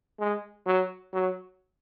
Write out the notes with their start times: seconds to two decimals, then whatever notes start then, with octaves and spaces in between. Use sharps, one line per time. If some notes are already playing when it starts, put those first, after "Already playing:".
0.20 G#3
0.66 F#3
1.14 F#3